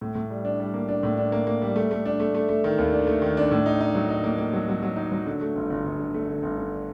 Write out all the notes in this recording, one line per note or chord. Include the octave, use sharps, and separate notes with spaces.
A2
A2
G3
D4
G3
A#3
D4
A2
D4
A#3
A#3
G3
A3
A3
D4
A3
A3
A3
D#3
D#2
D4
A3
D#3
D4
A2
D#4
D#4
F#3
D#4
A#3
A#3
F#3
F#3
F#3
D#4
F#3
D3
A3
G1
G1
G1
D3
A3
D3
G1
D3